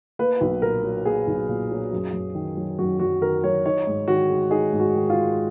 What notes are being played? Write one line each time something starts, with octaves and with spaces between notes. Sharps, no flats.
A#3 B4
B1
A#2 A#4
F#3
A#3 G#4
B1
A#2
F#3
F#2
F#2
D#3
F#3
F#2 F#4
F#2 F#4
D#3 A#4
F#3 C#5
D#4 C#5
G#2
D#3 F#4
G#3
D#4 G#4
G#2
F#4
D#3
F4
G#3